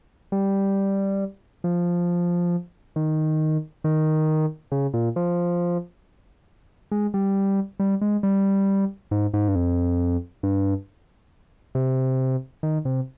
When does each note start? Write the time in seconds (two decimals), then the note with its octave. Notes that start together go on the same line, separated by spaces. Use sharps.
0.32 G3
1.64 F3
2.96 D#3
3.84 D#3
4.72 C#3
4.94 A#2
5.16 F3
6.91 G#3
7.14 G3
7.80 G3
8.01 G#3
8.23 G3
9.11 G#2
9.34 G#2
9.48 G2
9.55 F2
10.43 G2
11.75 C3
12.63 D#3
12.85 C3